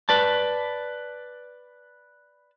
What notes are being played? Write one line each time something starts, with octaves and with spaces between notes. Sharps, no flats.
B4 D5 A5